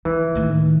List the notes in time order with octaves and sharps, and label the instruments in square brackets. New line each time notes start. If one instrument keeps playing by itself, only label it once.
[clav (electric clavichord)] E3 [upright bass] F3
[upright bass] A2 D#3